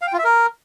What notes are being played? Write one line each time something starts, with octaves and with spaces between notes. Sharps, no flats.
F5
G5
F4
E5
A#4